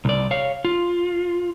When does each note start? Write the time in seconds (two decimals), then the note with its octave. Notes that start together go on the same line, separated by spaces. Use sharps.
0.05 C2 D5
0.31 C#5 F5
0.65 F4